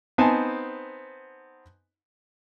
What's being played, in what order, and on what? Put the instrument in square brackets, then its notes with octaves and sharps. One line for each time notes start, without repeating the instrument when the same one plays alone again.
[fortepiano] B3 C4 D#4 C5 G#5 A5